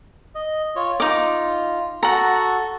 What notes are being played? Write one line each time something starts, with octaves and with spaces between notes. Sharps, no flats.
D#5
F4 C#5
D#4 F4 D6
F#4 A4 F#5 A#5